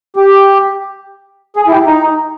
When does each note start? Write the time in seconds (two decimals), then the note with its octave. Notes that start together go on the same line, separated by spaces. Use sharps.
0.16 G4
1.56 G#4
1.67 E4
1.72 G4
1.87 D#4